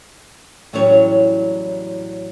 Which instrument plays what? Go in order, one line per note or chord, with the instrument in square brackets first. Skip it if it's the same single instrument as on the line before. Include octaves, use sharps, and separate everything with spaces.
[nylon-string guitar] A2 E3 F#3 G3 C#4 C#5